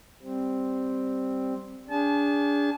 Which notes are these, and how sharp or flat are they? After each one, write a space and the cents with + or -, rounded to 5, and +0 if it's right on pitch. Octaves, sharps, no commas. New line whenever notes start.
G3 +0 C4 +0
D4 -30 G#4 -25 A5 -35